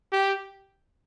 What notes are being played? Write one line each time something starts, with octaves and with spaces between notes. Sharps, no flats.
G4